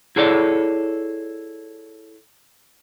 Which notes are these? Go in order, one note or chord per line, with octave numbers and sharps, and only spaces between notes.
E4 G#4 A4 C#5 D5